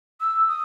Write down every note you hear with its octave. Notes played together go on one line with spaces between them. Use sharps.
E6
D#6